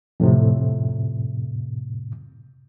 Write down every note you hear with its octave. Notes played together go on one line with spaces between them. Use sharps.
F2 A2 C3